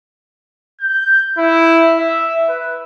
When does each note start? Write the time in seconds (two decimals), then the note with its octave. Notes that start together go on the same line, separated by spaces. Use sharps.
0.80 G6
1.38 E4
1.99 E5
2.49 B4